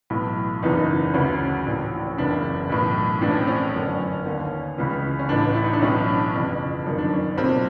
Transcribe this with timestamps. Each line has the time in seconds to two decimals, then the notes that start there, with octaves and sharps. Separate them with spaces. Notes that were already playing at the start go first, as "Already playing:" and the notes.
0.10 B1 A2 E3
0.62 F#1 E2 C#3 E3 D#4
1.14 D2 C#3 E3 C#4
1.66 A#1 A2 E3
2.07 C#4
2.17 F#1 E2 C#3 D4
2.70 B1 A2 E3
3.21 A#1 A2 E3 D4
3.30 C#4
3.39 C4
3.47 C#4
3.74 G1 F#2 D3
4.26 D#2 D3
4.78 C#2 C#3 E3
5.19 C#4
5.29 A1 A2 E3 D4
5.55 E4
5.64 D#4
5.73 D4
5.82 B1 A2 E3 C#4
6.08 D4
6.33 G1 F2 C#3 E3
6.86 G1 F#2 D#3 C#4
6.98 D4
7.13 C#4
7.37 B1 A#2 C4